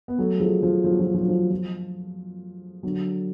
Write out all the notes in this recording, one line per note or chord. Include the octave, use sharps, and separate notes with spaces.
B3
F#3 A3
F3 G#3
F3
F3
F#3
F3
F#3
F3
F#3
F3
F3
D3 F#3